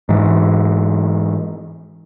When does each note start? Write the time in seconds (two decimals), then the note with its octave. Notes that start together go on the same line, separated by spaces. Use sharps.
0.09 G#2 E3